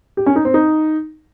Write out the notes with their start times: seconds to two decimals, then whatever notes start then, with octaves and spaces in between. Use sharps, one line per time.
0.17 G4
0.26 C#4
0.36 D#4
0.45 C4
0.54 D#4